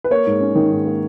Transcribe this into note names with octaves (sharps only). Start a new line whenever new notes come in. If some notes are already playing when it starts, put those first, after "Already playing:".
B4
A#3 C#5
G#2
C#4
D#3
G#2
A#3